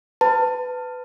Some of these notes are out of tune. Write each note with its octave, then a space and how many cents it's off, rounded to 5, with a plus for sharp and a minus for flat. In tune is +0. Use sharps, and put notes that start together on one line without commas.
B4 +20 A5 +25